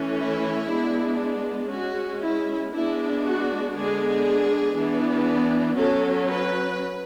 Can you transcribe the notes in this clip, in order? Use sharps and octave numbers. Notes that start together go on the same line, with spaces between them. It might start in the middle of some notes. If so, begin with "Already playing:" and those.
Already playing: E3 A3 C#4
E4
G#3 B3 D4
G#3 C#4 F#4
E4
G#3 B3 D4 E4
F#4
D3 G#3 B3 D4 G#4
E3 B3 D4
F#3 C#4 A4
B4